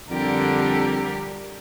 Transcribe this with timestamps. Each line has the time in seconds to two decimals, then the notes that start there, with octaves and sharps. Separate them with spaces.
0.10 F2 D3 G3 G4 A#4